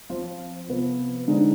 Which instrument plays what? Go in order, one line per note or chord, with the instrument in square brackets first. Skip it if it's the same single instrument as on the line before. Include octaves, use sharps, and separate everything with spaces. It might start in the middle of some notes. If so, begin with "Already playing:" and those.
[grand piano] F3 C4 F4
C3 F3 B3 F4
D3 G#3 C4 D#4